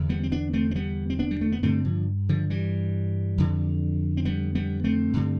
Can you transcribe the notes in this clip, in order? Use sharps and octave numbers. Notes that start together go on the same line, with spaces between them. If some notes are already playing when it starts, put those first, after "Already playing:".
Already playing: E2 D3
G3 B3
C4
B3 D4
A3 C4
C4
G3 B3
C4
B3 D4
G3
A3
B3
G2 D3 A3 C4
D3 F3
D3 F3
E3 G3
F2 D3
C4
G3 B3
G3 B3
A3 C4
G2 D3